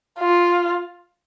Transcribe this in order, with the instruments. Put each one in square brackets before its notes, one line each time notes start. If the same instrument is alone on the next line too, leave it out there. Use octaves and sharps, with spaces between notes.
[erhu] F4